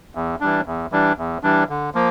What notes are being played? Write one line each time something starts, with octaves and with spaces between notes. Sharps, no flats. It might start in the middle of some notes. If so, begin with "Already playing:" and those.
E2
E3 G3 D4
E2
E3 G3 D4
E2
E3 G3 D4
D3
F3 A#3